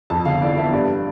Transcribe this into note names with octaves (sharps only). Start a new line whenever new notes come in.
F2 A5
G1 F5
E3 D5
B3 E5
G2 D5